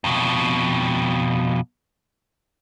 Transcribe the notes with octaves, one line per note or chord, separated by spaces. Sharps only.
F2 B2